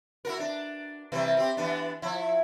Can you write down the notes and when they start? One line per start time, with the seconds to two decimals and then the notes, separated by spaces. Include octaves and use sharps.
0.25 E4 F#4 A#4
0.39 D4
1.12 C3 E3 G3
1.37 C4 G4
1.57 E3 B3 D4
2.02 F3 E4